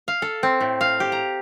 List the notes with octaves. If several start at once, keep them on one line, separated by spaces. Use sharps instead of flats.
F5
A4
C4
A2
F5
G4
A#5